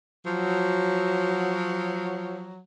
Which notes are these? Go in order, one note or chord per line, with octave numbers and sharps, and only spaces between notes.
F3 F#3